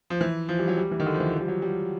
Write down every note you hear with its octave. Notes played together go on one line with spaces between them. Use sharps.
F3
E3
F3
G3
F#3
G3
E3
D#3
D3
F3
E3
F3
G3
F#3
G3